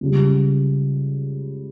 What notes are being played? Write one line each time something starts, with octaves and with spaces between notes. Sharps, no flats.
C#2 C#3 G3